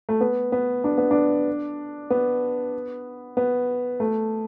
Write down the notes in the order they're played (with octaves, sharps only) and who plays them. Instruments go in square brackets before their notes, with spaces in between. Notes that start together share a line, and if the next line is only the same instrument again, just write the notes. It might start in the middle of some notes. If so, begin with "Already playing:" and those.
[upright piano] A3
B3
B3
D4
B3
D4
B3
B3
A3